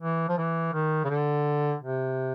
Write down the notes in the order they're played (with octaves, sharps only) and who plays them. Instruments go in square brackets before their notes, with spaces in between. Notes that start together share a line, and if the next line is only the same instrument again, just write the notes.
[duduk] E3
F3
E3
D#3
C#3
D3
C3